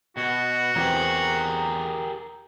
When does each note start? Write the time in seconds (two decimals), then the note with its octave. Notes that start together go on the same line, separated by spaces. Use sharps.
0.17 B2 F#4
0.75 E2 E3 C4 G4 G#4 A#4